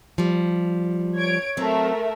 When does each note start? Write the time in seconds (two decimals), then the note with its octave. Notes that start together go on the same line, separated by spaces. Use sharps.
0.18 F3 G3
1.17 C#5 G#6 D7
1.57 F#3 A3 C4 A#4 E5